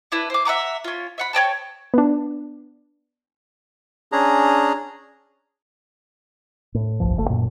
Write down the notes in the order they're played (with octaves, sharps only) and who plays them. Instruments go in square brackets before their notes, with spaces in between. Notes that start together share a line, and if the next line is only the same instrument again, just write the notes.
[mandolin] D4 E4 B4
C5 D6
E5 F#5 A#5 D6
C#4 F4
E5 F#5 B5
C#5 D5 G5 A5
[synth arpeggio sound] B3 D4
[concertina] C#4 D4 G#4 A#5
[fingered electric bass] A2
G1 C2 G2 F3
F#1 D2 A#2 A3
F#2 A#2